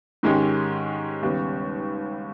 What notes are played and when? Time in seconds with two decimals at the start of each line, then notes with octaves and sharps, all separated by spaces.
0.23 G#2 D#3 G#3 C#4 G4
1.22 D#2 C#3 G3 B3